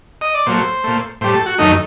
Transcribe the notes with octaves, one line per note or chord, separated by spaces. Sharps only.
D#5
D5
A#2 F#3 A3 C5
A#2 A3
A2 G3 C5
A4
F#4
F#2 D#3 A3 D#4